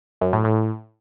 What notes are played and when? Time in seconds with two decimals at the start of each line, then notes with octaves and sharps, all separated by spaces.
0.21 F#2
0.33 A2
0.44 A2